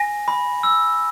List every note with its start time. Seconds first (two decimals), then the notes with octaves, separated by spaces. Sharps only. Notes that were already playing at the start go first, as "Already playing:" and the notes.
Already playing: G#5 A#6
0.28 B5
0.63 E6